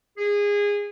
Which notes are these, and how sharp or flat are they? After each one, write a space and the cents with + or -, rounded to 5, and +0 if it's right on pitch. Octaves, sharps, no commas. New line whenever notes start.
G#4 -20